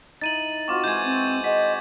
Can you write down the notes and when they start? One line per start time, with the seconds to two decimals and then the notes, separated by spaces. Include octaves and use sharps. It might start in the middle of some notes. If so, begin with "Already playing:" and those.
0.21 D#4 E4 A6 D#7 F#7
0.68 C4 F4 F#4 C#6 D6
0.84 E3 G#3 C6 G6 G#6
1.05 C4 C#6
1.44 G#4 D#5 F#5 B6